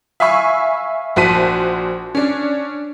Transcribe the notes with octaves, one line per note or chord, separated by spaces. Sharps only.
E5 F5 G#5 B5 C#6 E6
A#1 F#4 C5 A5 B6 D#7
C#4 D4